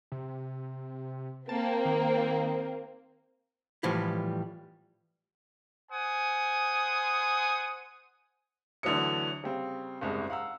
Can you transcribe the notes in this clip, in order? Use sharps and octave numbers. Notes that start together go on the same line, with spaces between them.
C3
A#3 C4 A5
D#3
A2 E3 F3 G3
C5 F#5 G#5 D#6
D2 D3 E3 F#3 D#6 C#7
C#3 G3 C4
F#1 C2 G#2 G#4
F5 F#5 A#5 E6